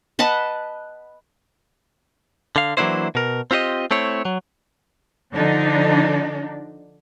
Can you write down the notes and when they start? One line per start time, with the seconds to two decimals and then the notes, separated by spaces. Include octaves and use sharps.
0.19 B4 D#5 F#5 A5
2.56 D3 F5
2.77 E3 F#3 A#3 D4 E4 C5
3.15 B2 A#4
3.51 C4 F4 G4 C5 D#5
3.91 A3 C4 E4 C#5
4.25 F#3
5.33 D3 F3 D4 D#4